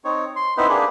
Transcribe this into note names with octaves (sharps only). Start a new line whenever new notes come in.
C4 D#4 C#5
C6
B3 C4 D#4 E4 B4 C5
A#3 D4 G4 G#4 B4